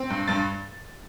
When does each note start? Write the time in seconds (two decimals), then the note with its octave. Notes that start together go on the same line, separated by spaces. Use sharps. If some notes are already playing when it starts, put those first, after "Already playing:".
Already playing: C4
0.10 G2
0.28 G2 A6